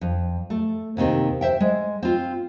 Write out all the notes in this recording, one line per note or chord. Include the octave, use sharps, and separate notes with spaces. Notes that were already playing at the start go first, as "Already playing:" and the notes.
F2
A3
D#2 C3 D#3 C4
C5 E5 G5
G#3
C4 F4